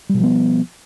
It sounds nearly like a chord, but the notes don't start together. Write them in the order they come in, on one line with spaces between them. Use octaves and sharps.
G3 B2 F3 B3